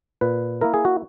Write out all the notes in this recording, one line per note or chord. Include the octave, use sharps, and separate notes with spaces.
A#2 B4
A#3 E4 A#4
G#4
F#4